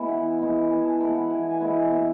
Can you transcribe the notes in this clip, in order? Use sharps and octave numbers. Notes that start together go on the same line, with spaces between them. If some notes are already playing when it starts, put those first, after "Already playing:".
Already playing: G#3 B3 E4 E5 G#5
E3 F#5
G#3 B3 E4
E3 G#5
A5
G#3 B3 E4 B5
F#5
E3 G#5
G#5
G#3 B3 E4 G#5
F#5
B2 E5